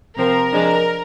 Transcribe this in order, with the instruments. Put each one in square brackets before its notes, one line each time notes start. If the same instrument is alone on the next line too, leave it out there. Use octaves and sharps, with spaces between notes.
[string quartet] C3 F3 C4 [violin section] A#4
[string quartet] F3 G#3 D4